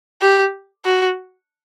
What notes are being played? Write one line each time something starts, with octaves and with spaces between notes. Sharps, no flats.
G4
F#4